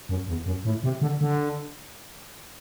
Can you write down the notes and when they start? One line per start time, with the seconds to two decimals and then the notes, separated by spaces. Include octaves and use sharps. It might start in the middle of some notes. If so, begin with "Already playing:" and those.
0.09 F#2
0.28 E2
0.46 F#2
0.65 A2
0.83 C3
1.01 D3
1.21 D3